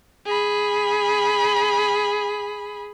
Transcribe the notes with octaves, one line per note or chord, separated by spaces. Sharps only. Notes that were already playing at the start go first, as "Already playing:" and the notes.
G#4 B5